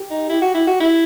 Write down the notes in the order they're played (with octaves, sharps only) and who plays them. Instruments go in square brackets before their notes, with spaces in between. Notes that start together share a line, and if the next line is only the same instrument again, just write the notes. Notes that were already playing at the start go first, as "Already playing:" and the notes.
Already playing: [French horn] G4
[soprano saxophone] D#4
[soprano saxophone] E4 [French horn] G4
[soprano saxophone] F#4
E4
F#4
E4